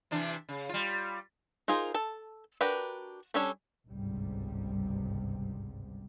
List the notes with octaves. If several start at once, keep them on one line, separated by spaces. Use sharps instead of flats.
C3 E3 D4
C#3
G3 F4
D#4 F4 G#4 A#4 C5
A4 A5
D4 F#4 G4 A#4 B4
G3 C#4 D4 A4 C#5
G1 C#2 G#2 C3 G3